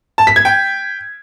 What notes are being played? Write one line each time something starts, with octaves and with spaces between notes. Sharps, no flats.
A5
B6
G#6
G5